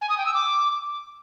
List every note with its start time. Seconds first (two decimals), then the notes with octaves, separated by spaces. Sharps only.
0.01 G#5
0.10 D#6
0.18 G5
0.26 E6
0.34 D6